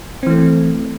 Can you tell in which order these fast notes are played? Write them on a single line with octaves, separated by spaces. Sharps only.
C4 E3 A3